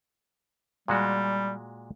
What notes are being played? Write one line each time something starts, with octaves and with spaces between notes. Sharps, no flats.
A#2 G3 G#3 F#4